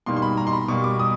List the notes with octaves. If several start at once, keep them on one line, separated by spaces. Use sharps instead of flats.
B2 G3 A#3 D#4 C6
C6
B5
A#5
C6
B5
B2 G3 A#3 C#6
D6
D#6